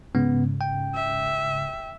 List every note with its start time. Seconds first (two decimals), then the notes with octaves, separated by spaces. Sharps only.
0.15 G#2 C#3 B3
0.61 G5
0.95 E5